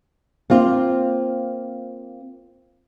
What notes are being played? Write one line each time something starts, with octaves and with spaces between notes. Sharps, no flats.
A#3 C4 F4